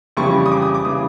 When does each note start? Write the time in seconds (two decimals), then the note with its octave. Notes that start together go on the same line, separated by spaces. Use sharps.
0.17 F2 C#3 E3 G3 C#6
0.46 D#6
0.52 D6
0.62 D#6
0.74 D6
0.85 C#3 E3 G3 D#6